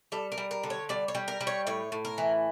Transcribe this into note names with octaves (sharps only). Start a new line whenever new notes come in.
G3 A4
A#4
G3
A#4
D3
C#5
G3 D5
C#5
G3
A#4
G3
C#5
A2 C#5
A2
A#4
E3